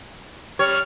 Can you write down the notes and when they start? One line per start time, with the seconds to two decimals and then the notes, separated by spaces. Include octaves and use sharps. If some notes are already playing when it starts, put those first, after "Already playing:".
0.59 G3 C#5 F6